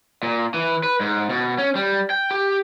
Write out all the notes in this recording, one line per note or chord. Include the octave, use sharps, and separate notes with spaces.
A#2
E3
B4
G#2
B2
C#4
G3
G5
G4